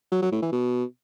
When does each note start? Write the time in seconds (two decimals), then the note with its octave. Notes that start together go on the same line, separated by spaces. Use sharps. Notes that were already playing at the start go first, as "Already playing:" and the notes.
0.12 F#3
0.22 F#3
0.32 A2
0.42 E3
0.52 B2